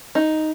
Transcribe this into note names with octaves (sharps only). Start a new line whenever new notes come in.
D#4